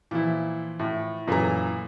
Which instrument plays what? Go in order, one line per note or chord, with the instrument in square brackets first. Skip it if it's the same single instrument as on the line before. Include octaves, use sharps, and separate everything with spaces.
[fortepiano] A#2 E4 [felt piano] E3 F3
[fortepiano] A2
[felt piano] F#2 A4 A#5 [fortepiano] A#2 E3